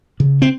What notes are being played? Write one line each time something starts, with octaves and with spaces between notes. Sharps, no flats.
C#3
C4